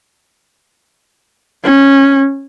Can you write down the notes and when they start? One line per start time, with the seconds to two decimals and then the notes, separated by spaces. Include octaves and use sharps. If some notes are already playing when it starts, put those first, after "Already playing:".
1.64 C#4